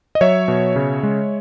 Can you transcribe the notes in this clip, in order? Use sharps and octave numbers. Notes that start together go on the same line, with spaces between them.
D#5
F#3 C#5 E5
B2
C#3
G#3